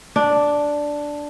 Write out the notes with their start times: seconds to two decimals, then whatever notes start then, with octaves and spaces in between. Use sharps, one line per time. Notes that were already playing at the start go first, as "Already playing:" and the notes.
0.16 D4